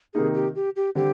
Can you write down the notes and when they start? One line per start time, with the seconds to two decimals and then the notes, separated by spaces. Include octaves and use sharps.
0.14 C3 D#3 A#3 D#4 G#4
0.34 G4
0.56 G4
0.76 G4
0.95 D3 G3 C4 G4